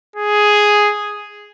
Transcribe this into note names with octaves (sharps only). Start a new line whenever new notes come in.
G#4